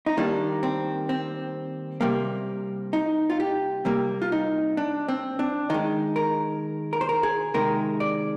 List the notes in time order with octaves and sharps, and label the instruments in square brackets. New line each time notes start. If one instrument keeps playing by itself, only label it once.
[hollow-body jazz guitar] D#4
D#3 G3 A#3 D4
C4
C4
C3 G3 A#3
D#4
F4
G4
C3 G3 A#3
F4
D#4
D4
C4
D4
D#3 G#3 D#4
A#4
A#4
C5
A#4
G#4
C3 D#3 G#3 A#4
D5